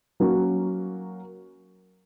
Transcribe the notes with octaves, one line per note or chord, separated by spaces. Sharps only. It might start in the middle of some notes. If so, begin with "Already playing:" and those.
F#3 A#3 C#4 F#4